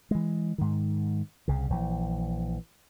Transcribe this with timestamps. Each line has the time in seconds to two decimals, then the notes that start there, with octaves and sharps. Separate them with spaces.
0.11 E3 G#3
0.58 G#2 D#3
1.48 C2 C#3
1.70 A#1 E3